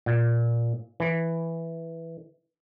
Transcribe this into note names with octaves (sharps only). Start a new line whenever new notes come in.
A#2
E3